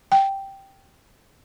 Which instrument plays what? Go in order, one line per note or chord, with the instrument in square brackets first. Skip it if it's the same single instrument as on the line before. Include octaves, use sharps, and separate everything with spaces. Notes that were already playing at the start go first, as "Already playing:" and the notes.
[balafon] G5